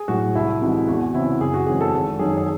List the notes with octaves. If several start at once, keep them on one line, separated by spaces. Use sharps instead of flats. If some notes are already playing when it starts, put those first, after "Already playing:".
Already playing: G#4
A2 F#3 F#4
C2 E4
C3 E3 G#3 F#4
E2 F#4
C#3 E3 C4 E4
F#1 G#4
F#4
F#2 E3 G#3 C4 G#4
A4
G#1 A4
F#2 D#3 F#3 C#4 G#4
G#4